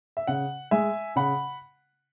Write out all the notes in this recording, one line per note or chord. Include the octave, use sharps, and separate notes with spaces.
E5
C#3 F#5
G#3 E5 G#5
C#3 F#5 B5